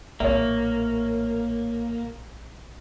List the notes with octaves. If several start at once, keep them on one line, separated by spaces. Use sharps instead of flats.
A#1 A2 A#3 C#5 E5